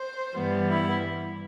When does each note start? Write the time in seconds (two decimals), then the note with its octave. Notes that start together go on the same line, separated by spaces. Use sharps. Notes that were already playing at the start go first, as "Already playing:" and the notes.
Already playing: C5
0.35 G2 E3 G3 B3
0.69 E4